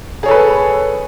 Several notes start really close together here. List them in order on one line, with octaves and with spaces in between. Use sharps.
G#4 C#5 A4 B4